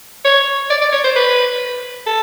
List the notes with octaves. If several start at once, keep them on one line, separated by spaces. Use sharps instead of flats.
C#5
D5
D5
C#5
C5
B4
A4